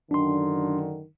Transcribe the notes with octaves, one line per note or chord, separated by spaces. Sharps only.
F#2 D3 D#3 D4 C6